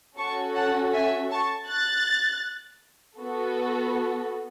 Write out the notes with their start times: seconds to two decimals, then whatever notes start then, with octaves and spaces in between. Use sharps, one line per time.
0.18 C#4 F#4 A4 A5 C#6
0.56 F#5 A5
0.93 E5 G#5
1.31 A5 C#6
1.68 F#6 A6
3.20 B3 F#4 A4